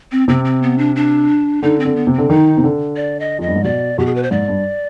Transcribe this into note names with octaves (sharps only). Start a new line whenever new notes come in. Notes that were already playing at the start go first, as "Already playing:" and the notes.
C4
C3 C4
C4
B3
D4
D4
D3 D#4
C4
D3
B3
C3
D3 C4
D#3 D#4
C3
D3
D5
D#5
F2 D#5
G2
G#2
B2 D5
B2 G4
G#4
B4
C5
G#2 D5
G2